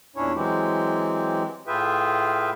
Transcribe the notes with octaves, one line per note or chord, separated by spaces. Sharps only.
E2 A#2 C#4 D4 E4 C#5
E3 F#3 G#3 C4 G4
A2 F4 G#4 B4 E5 G5